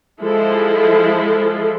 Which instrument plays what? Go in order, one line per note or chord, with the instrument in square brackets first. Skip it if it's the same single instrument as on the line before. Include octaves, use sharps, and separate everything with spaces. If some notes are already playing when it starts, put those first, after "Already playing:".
[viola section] F3 G#3 E4 A4